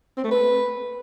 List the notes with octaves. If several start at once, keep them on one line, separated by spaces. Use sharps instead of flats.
C4
A3
B4